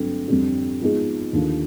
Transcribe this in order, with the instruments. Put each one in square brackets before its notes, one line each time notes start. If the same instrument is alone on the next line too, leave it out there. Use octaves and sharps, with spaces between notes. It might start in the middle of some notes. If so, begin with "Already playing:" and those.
Already playing: [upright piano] G2 D3 F#3 A3 C4
F2 D3 G3 C4
F3 G#3 B3 D#4 G#4
D#2 D3 F3